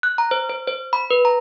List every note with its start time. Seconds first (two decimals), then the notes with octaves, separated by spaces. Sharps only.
0.03 F#6
0.18 A#5
0.31 C5
0.50 C5
0.67 C5
0.93 B5
1.10 B4
1.25 A#5